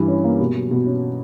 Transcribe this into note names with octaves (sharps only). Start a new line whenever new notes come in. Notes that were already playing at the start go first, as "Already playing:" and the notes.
Already playing: G2 E3
C#4
A#3
B2
F#3
B2
C#4